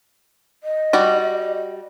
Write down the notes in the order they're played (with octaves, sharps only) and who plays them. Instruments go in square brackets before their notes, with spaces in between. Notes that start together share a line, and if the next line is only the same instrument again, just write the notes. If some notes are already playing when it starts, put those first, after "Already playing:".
[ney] D#5
[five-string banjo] G3 F#4 D5